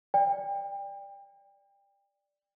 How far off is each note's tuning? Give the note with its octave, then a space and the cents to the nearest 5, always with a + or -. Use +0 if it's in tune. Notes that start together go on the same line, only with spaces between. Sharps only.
D5 +0 G5 +30